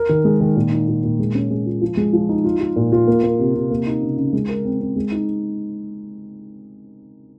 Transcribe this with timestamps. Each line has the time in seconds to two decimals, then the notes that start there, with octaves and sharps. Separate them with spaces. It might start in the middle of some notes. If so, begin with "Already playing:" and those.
Already playing: A#4
0.09 D#3
0.25 G#3
0.41 D#3
0.56 A#2
0.72 D#4
0.88 A#2
1.03 A#2
1.19 G#3
1.35 C#4
1.50 G#3
1.66 F4
1.82 F3
1.97 G#3
2.13 F3
2.29 D#4
2.45 F4
2.61 F4
2.76 A#2
2.92 F4
3.07 A#3
3.23 A#3
3.39 C3
3.55 C3
3.71 A#3
3.86 D#4
4.02 C#3
4.17 C#3
4.33 G#3
4.49 A#4
4.65 C4
4.80 C4
4.96 G#3
5.12 D#4